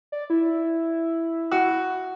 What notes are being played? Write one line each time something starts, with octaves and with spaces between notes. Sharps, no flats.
D5
E4
F#4